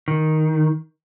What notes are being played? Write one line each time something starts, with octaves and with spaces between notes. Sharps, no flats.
D#3